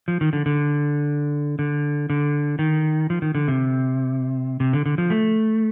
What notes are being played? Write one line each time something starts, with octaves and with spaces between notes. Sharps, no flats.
F3
D#3
D3
D3
D3
D3
D#3
F3
D#3
D3
C3
C3
D3
D3
F3
A3